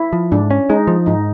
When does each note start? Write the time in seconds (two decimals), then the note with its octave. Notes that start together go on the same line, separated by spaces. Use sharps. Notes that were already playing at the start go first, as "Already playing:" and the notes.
Already playing: E4
0.13 F3
0.32 G#2 D4
0.51 C#4
0.70 G#3 D#4
0.87 F3
1.06 G#2 D#4